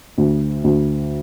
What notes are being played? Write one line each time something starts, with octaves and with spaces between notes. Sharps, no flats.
D2
D2